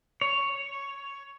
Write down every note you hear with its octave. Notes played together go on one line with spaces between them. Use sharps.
C#5